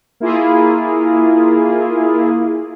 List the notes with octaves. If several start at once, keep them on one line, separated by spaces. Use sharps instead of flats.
A#3 E4 F4 G#4